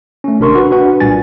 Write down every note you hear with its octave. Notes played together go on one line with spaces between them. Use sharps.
A3 C#4
G#1 C3 D4 A#4 C6 C#6
F#4 B4
D4 F#4 B4 F#5
C2 A#2 G3 G#5 A6